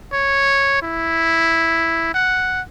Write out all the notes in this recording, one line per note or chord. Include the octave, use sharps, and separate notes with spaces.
C#5
E4
F#5